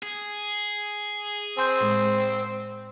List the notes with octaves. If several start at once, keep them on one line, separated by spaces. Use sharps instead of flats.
G#4
C4 G#5 C6 G6
A2 G#3